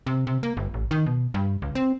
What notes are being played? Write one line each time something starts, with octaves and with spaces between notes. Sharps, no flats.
C3
C3
A#3
G1
A1
D#3
B2
G2
C#2
C4